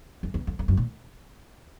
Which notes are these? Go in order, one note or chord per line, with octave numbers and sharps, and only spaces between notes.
F2
E2
F2
F2
F#2
A#2